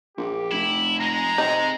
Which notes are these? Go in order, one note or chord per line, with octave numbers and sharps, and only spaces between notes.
A#1 G4
F1 E4
G#3 A#5
C3 D#4